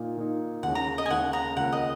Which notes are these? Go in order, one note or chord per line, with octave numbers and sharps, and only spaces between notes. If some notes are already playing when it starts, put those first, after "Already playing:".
Already playing: A#2 A#3 D#4
A#2 A#3 D#4
D#2 C#3 G#3 C#4 F#5
A#5
D#5
G#5
D#2 C#3 G#3 C#4 F#5
A#5
C#2 C#3 A#3 F#5
D#5